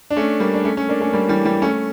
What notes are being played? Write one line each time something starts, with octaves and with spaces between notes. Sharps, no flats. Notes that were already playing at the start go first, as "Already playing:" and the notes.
D4
A3 C#4
G3 A#3
D4
A3 C#4
A3 C#4
A#3 D4
A3 C#4
G3 A#3
E3 G3
E3 G3
A3 C#4